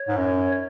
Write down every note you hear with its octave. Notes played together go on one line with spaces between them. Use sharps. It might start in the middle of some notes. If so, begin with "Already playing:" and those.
Already playing: C#5
G#2
F#2